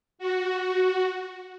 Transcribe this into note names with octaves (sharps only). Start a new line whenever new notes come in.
F#4